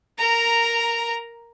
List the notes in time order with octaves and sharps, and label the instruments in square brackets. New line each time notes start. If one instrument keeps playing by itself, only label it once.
[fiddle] A#4 A#5